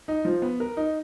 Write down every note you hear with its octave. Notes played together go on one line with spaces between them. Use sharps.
D#4
F3
B3
A#4
D#4